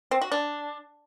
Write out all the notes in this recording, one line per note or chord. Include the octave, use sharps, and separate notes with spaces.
C4
F#4
D4